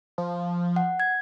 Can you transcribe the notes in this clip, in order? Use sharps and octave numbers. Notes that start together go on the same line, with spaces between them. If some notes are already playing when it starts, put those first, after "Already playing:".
F3
F#5
G#6